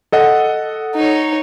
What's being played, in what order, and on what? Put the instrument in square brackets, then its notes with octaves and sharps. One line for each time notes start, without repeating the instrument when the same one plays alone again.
[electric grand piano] A4 D#5 F#5
[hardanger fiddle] D#4 C#5